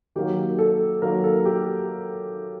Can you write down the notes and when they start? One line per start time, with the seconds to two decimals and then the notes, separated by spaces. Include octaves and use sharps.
0.15 D#3 F#3 A#3 G4
0.59 A4
1.02 D#3 F#3 A#3 A#4
1.24 A4
1.45 G4